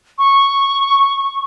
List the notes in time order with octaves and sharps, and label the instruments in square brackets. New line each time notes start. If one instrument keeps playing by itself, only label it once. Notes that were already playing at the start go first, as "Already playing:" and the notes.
[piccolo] C#6